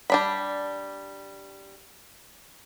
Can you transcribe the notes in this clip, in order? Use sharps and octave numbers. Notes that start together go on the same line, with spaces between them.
G3 D4 B5